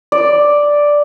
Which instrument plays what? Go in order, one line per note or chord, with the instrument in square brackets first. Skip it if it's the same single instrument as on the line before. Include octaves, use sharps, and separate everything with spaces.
[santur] D5